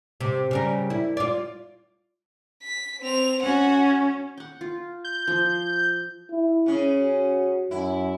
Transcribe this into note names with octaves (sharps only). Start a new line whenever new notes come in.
C3
C#3 G3 A#4
E4
F4 D5
B6
C4 F7
C#4 F#4 F#5
F#5 G5
F4
G6
F3 C5
E4
C#3 C#4
F#4
F#2 E4